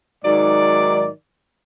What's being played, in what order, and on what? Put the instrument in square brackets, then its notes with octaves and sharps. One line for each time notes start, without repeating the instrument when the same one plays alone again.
[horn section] G#2 D#3 F#3 D5